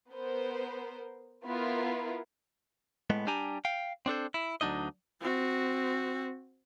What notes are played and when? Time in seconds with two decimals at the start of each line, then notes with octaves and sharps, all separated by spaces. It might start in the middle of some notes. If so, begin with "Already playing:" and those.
0.11 B3 A#4 C5
1.46 B3 E4 F4 A#4
3.10 A2 G#3 B3
3.27 G3 D4 G4 G#5 A#5
3.65 F5 G5
4.06 C4 D4 A4 C5
4.34 E4
4.61 D2 F#3 D4 D#4 D#5
5.21 C4 F#4